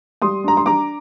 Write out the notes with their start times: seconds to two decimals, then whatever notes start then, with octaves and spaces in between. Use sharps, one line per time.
0.22 G3 C6 D#6
0.44 D4 A#5
0.57 C6
0.66 D4 A#5 D6